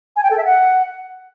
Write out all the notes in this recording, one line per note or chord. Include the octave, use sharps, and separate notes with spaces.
G#5
G5
A4
E5
F#5